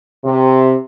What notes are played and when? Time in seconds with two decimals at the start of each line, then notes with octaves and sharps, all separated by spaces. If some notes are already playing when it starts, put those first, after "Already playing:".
0.25 C3